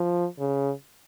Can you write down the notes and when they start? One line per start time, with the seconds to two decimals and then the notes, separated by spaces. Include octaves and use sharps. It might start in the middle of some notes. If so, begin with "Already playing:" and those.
Already playing: F3
0.39 C#3